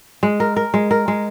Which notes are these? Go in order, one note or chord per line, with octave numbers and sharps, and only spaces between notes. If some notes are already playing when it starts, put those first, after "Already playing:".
G#3
A#4
A#4
G#3
A#4
G#3